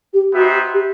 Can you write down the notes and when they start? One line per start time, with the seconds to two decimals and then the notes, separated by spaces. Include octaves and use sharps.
0.14 G4
0.34 B3 D#4 F#4 G4 C5 E5
0.74 G4